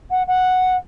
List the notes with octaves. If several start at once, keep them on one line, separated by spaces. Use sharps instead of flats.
F#5
F#5